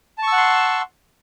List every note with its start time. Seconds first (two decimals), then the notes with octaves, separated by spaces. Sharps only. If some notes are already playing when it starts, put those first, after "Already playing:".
0.18 A5
0.23 C#6
0.28 E6
0.32 F#5
0.37 C6